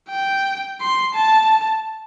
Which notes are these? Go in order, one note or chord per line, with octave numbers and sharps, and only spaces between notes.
G5
C6
A5